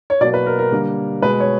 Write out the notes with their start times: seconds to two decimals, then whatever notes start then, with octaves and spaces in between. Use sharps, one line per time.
0.10 C#5
0.21 B2 F#3 A#3 D5
0.34 B4
0.46 A#4
0.59 A#4
0.72 D3 G3 A#3
1.22 B2 G#3 B4
1.40 C#5